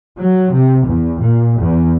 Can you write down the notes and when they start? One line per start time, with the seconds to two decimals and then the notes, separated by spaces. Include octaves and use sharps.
0.18 F#3
0.55 C3
0.88 E2
1.25 A#2
1.60 E2